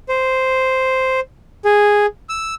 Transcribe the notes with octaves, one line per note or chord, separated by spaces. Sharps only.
C5
G#4
E6